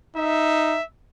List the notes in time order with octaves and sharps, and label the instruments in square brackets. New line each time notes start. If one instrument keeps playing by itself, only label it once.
[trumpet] D#4 [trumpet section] E5